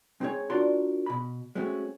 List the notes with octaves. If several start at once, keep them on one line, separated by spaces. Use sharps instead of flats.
G#3 C4 D#4 F#4 G#4 C#5
D4 F4 F#4 A#4 D5 C6
B2 B5
G#3 A3 C4 C#4 F#4